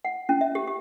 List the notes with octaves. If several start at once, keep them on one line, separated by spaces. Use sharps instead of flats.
F#5
C#4
E5
G4
G4